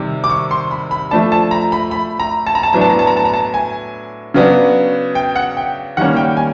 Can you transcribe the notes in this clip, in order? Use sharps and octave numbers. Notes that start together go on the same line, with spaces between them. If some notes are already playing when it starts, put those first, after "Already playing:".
Already playing: C3 D#3 G3
D6
C#6
C6
B5
B5
F3 A3 D4 A5
A5
A#5
B5
B5
A#5
A5
A#5
A5
A2 F#3 B3 D4 A#5
A5
A#5
A5
A#5
A5
A#5
A5
G#5
C#3 F#3 B3 D4
G5
F#5
G5
D#3 G3 A#3 C#4 F#5
G5
G#5